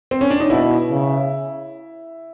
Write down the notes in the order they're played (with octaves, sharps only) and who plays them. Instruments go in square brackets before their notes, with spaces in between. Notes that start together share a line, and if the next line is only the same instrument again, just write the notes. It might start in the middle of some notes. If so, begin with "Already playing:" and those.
[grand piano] C4
C#4
D4
D#4
[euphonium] B2 [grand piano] E4
[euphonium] C#3